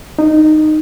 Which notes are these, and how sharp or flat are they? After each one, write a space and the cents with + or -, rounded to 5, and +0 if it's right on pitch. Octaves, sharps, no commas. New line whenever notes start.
D#4 -10